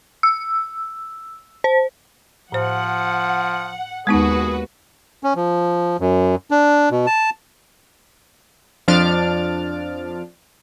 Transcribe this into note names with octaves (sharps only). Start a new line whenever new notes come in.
E6
C5
A2 F3 C5 F#5
D#2 G#3 B3 D#4 F#4 G#4 B4
C#4
F3
F#2
D4
B2
A5
F2 F3 D4 F6 A6 D7